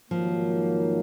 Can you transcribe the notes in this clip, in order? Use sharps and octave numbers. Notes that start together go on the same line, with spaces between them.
G#2 D#3 F3 F#3 A#3